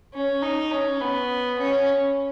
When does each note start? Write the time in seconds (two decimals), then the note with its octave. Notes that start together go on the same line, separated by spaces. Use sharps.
0.14 C#4
0.42 D#4
0.71 C#4
1.00 B3
1.59 C#4